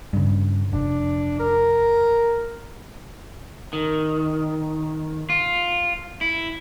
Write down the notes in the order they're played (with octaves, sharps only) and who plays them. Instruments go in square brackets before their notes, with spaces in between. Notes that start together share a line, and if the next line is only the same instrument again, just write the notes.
[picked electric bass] G2 C#3
[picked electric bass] F1 [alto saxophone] D4
[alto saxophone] A#4
[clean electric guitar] D#3
F4
E4